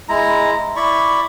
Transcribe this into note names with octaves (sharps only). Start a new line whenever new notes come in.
G#3 E4 A#5
E4 D5 B5 C#6